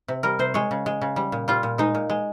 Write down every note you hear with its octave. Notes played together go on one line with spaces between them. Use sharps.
C3
G3 A#4
C3 C5
G#3 C#5
C#3
G#3
C#3
G3
A#2
G3 F4
A#2
G#3 D#4
A#2
G#3